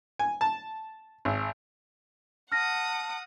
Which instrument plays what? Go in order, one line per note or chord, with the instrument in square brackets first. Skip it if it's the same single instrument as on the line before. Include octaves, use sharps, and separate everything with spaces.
[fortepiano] G#5
A5
G#1
[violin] F#5 D#6 [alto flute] A5 [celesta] F6 A#6